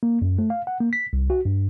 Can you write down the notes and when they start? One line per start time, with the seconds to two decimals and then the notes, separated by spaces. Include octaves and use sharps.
0.03 A#3
0.22 F#2
0.39 A3
0.50 F5
0.67 F#5
0.81 A#3
0.93 B6
1.13 C2
1.30 F#4
1.45 G2